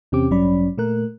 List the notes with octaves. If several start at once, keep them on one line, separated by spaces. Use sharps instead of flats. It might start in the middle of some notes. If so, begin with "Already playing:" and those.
E2 C3 C4 C#4 G4 D6
A1 G2 F#3 C#4 D5 B5
A#2 A3 A#4 F#6